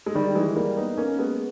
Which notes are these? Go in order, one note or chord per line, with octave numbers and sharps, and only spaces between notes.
G#3
D#3 G3
E3 G#3
G3 A#3
B3 D#4
A#3 C#4
G#3 B3